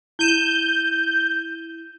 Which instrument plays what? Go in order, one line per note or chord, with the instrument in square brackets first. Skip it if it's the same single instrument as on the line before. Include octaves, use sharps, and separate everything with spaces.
[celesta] E4 D#7 E7 [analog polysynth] G6